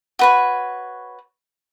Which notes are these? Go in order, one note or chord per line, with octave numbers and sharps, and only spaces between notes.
F#4 B4 C#5